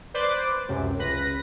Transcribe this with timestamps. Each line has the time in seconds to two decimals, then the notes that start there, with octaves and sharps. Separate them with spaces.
0.14 B4 C5 D5 D6
0.68 C#2 F#2 C3
0.99 C#2 B4 A#6